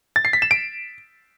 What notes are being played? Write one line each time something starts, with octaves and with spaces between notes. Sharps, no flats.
A6
C7
B6
E7
D7